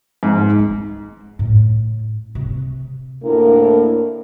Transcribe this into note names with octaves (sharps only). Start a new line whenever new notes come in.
G#2
E4
A2
C3
D2 A2 A#3 D4 E4 A#4